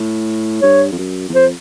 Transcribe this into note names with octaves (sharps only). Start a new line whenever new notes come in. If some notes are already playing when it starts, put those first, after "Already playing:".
Already playing: A2
G2 C#5
F2
F#2
E2
F2 C5